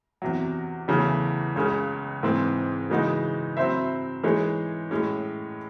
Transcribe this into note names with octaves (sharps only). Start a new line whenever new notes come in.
E2 C3 F#3
E2 C#3 E3 A3 C#4
C#2 C#3 G#3 C#4
G#2 E3 C4
C#3 E3 G#3 D#4 F#4
F#3 C4 E4 C5 E5
E3 G#3 D#4 G#4 C#5
A2 G#3 C#4